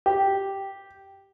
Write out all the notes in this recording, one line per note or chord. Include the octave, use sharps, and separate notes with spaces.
G4